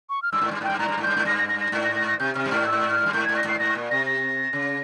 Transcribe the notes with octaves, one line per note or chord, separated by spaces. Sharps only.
C#6
F6
G2 E6
G#2
G2
G#2 G5
G2
G#2 A#5
G2
G#2
G2 G6
G#2
G2 A#6
A#6
A#6
A#6
G#2
A#6
A#6
A#6
C3 G6
C3 F6
G2
G#2 F6
E6
F6
G2
G#2 G6
G#2 G#6
A#6
G#2 C7
G#2 A#6
A#2
C3 A#6
A#6
C#3